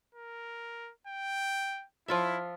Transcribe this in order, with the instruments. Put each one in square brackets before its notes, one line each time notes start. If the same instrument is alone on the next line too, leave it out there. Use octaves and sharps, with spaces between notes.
[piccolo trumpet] A#4
G5
[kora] F3 F4 E5 [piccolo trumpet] E4